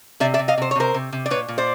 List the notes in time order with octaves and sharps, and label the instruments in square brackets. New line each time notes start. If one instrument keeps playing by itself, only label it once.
[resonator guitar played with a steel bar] C3 D5 E5
D5 E5
C3
D#5 F5
C3 C5
C#5
C3 A#4 C5
C3
C3
D5
A#2 B4 C#5
A#2
C5 D5